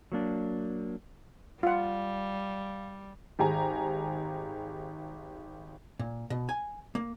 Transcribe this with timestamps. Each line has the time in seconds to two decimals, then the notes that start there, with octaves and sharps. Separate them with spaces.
0.12 F#3 A#3 D4
1.63 G3 F4 F5 F#5
3.39 G#1 G4 G#4 G#5 A#5
5.99 A#2
6.30 B2
6.49 G#5
6.95 A#3